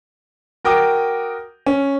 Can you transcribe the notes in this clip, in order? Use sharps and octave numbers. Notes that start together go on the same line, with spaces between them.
F#4 A#4 G5 D6 D#6
C#4